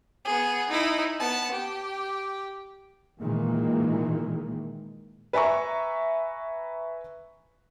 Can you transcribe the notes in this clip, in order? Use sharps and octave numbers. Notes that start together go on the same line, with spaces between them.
B3 G#4
D#4 E4
B3 A5
G4
A#2 D#3 E3 G#3 A#3
B4 E5 G#5 A#5 C#6